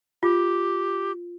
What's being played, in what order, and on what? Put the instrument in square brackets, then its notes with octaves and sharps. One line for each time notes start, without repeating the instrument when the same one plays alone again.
[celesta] F4 [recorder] G4